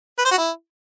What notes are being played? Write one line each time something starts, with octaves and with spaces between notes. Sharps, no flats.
B4
C5
F#4
E4